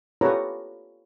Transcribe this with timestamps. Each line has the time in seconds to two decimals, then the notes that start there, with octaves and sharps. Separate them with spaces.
0.21 F4 G4 A4 B4 C#5 A#5